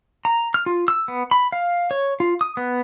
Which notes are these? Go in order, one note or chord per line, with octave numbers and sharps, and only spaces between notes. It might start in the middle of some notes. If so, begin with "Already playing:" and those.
A#5
F6
F4
E6
B3
B5
F5
C#5
F4
D#6
B3